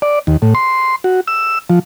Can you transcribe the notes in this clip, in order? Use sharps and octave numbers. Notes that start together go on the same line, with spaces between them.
D5
D#2
A2
C6
F#4
E6
F3